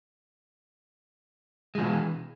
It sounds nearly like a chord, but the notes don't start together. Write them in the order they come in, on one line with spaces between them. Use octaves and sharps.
G#3 F3 B2 E3